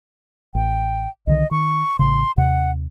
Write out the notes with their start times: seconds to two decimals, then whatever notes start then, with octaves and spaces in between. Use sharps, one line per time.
0.55 A1 G5
1.27 C2 D3 D#3 D#5
1.51 D#3 C#6
1.99 A1 C#3 C6
2.38 D#2 C3 F#5